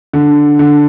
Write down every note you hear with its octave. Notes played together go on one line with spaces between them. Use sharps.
D3
D3